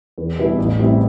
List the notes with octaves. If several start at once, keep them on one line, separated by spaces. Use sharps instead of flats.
E2
B2 G3 B3 E4
A1
A2 G3 C4 E4